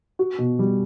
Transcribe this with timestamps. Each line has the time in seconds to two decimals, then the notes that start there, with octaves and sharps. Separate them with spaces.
0.19 F#4
0.38 B2
0.59 G3